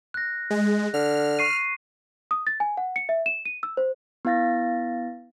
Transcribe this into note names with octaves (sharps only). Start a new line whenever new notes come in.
F#6 A#6
G#3
D3 F6
C#6 C7 D#7
D#6
A6
G#5
F#5
C#7
E5
E7
D#7
E6
C5
B3 E4 F5 A6 A#6